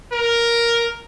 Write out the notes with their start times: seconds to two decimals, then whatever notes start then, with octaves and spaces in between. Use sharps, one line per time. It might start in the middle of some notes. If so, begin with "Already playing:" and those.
0.12 A#4